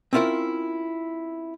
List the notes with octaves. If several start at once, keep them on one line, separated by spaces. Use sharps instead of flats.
C4 C#4 E4 F4 A#4 C5